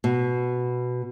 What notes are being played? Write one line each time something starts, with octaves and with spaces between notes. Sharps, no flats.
B2